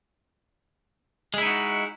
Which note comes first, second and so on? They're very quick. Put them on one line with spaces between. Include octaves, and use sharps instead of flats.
G#3 E4 D#4 F#4